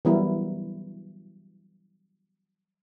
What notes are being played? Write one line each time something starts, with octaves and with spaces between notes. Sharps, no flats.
E3 F#3 G3 B3 E4 A#4